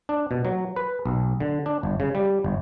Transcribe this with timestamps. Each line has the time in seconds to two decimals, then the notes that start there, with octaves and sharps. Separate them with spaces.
0.09 D4
0.31 B2
0.45 F#3
0.76 B4
1.06 B1
1.40 D3
1.66 D4
1.83 G1
2.00 C#3
2.15 G3
2.44 G1